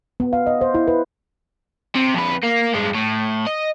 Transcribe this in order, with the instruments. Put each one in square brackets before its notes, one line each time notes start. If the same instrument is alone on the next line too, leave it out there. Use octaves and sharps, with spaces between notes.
[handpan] B3
F5
D#5
C5
E4
B4
[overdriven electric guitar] C3
F2 B4
A#3
G2 G#3
A2
D#5